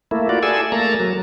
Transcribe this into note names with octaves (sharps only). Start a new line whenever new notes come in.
A3 A#3 E4
F4 F#4 D5
G#4 A4 D5 G#5 E6
A3 A#3 A5 A#5
F#3